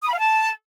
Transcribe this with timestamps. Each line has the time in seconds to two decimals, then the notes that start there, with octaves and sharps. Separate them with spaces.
0.02 D#6
0.08 B5
0.13 F5
0.18 A5